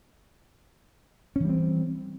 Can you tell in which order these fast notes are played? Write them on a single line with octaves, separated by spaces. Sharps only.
C#4 E3 G3 C4